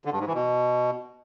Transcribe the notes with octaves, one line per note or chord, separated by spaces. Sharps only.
D3
G2
G#2
E3
B2